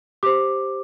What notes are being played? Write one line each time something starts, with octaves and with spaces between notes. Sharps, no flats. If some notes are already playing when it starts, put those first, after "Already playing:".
G4 C5 D6